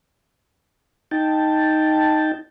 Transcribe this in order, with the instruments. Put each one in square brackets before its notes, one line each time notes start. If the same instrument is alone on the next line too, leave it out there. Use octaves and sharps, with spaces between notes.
[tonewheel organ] D#4 G5 A5